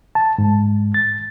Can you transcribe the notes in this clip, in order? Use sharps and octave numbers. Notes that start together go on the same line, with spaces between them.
A5
G#2
A6